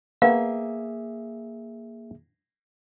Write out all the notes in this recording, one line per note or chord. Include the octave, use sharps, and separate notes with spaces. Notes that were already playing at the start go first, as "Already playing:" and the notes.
A#3 B3 G#4 E5 F5